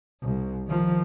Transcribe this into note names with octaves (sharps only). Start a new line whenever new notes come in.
C2
D#3 F3